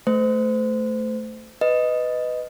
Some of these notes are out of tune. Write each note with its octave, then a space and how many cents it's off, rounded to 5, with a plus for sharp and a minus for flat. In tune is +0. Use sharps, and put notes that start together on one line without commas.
A3 +0 C5 -30
B4 +15 D#5 +0